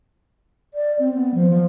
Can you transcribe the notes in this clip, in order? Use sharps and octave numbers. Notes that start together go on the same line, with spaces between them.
D5
C4
B3
F3
F3